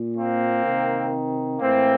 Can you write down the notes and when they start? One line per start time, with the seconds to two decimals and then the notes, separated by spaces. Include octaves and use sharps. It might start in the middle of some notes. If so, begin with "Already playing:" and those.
Already playing: A#2
0.16 A#3 C4
0.64 C3 D#3
1.59 A2 E3 A#3 C4